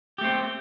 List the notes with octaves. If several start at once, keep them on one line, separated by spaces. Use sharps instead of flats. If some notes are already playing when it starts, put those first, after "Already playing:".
A3 C4 G4